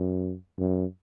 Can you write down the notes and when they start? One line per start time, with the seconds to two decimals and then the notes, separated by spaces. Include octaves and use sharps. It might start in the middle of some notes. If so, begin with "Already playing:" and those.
Already playing: F#2
0.59 F#2